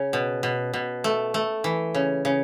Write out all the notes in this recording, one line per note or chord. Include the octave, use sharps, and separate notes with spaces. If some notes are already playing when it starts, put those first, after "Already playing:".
Already playing: C#3 C#4
B2
B2
B2
A3
A3
E3
C#3
C#3